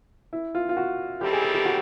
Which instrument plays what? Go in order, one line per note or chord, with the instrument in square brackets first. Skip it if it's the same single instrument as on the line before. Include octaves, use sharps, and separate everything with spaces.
[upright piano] E4
F4
F4
F#4
[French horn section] D#3 G3 C4 E4 A4 [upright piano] G4
[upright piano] G#4
G#4
G4
F#4